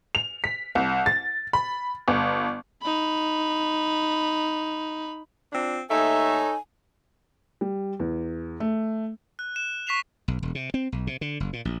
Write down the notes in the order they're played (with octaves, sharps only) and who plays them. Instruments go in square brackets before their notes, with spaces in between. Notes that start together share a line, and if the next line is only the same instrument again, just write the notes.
[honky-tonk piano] F7
B6
C2
A6
B5
G1
[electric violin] D#4 B5
[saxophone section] C4 D4 F4
[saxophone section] D#2 A3 E5 [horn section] D#4 A4 C#5 [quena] G#5
[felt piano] G3
E2
A3
[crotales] F#6
E7
C#6 B6 C7 E7 F7
[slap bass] B1
E1
C3
C4
B1
C3
D3
F#1
A#2
A#1